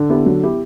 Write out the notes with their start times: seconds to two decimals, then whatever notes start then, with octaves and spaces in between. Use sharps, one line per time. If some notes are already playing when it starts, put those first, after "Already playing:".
Already playing: D3
0.10 B3 E4 G4
0.26 F#3
0.43 B3 E4 G4